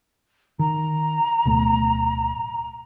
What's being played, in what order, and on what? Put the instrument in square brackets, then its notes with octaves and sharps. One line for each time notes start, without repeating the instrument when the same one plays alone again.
[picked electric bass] D#3 [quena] A#5
[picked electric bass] D1 B2 A3